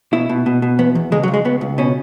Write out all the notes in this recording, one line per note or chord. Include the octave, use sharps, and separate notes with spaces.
B2 E4
B2
B2
B2
E2 B3
E2
C#2 G#3
F#3
C#2
G#3
C#2 B3
C#2
B2 C#4